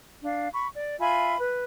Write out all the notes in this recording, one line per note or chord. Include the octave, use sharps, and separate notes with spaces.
D4 F5
B5 C#6
D5
F4 E5 G#5 B5
B4